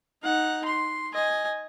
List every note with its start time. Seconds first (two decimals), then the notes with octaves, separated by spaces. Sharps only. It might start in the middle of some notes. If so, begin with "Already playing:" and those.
0.23 D#4 F#5
0.65 C6
1.14 D#5 G#5